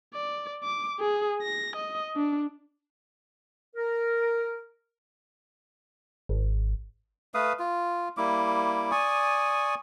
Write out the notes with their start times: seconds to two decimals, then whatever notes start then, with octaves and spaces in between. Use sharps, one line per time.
0.14 D5
0.64 D6
1.00 G#4
1.43 A#6
1.76 D#5
2.16 D4
3.76 A#4
6.29 G#1
7.34 A3 B4 F5 D#6
7.59 F4
8.17 G3 A#3 E4 D6
8.91 D5 G#5 C#6 D#6